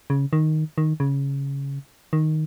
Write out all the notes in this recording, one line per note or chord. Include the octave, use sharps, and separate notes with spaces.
C#3
D#3
D#3
C#3
D#3